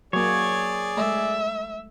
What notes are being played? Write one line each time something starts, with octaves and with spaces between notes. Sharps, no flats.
F#3 A#3 G#4 C#5 D5
G#3 A3 E5